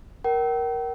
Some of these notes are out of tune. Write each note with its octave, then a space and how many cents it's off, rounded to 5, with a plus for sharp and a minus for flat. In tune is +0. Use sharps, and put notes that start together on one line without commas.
A#4 +10 G5 -40